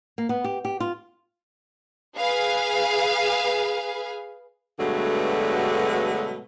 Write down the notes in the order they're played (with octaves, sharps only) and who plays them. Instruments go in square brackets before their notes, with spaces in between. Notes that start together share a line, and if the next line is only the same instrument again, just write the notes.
[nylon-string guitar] A#3
B3
G4
G4
F4
[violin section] G#4 B4 F5
[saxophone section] G2 B2 D3 F#3 G#3 A3